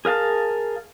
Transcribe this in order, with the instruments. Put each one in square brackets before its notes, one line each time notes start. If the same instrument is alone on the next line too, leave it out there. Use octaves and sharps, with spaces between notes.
[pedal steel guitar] G#4 A#4 F5 A5